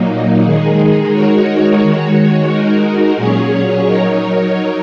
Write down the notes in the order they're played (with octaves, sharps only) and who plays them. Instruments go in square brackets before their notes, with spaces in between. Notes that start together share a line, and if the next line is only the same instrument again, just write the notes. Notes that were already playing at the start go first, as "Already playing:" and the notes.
Already playing: [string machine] A#2 F#3 A#3 D#4
D#3 G#3 D#4 G#4
G#3 D#4 F#4 A#4 C#5
D#3 G#3 F#4 C#5
G#3 D#4 F#4 A#4
A#2 F#3 C#4 G#4 C#5
F#3 D#4 A#4 C#5